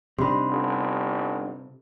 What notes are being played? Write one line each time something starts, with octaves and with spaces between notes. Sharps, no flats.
C3 G3 D4 D#4 B5 C6
G1